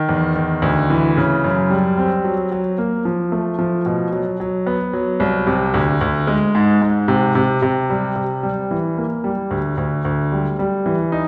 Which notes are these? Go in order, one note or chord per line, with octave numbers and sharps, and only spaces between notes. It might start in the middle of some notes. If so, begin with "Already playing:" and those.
Already playing: D#3
E2
D#3
D2
E3
C#3
F#2
G3
C4
F#3
F#3
A#3
F3
A3
F3
B2
F#3
F#3
B3
F#3
C2
C3
D2
D2
G#3
G#2
G#2
C3
C3
C3
G3
C3
G3
E3
A#3
G3
D2
D2
D2
G3
G3
E3
D#4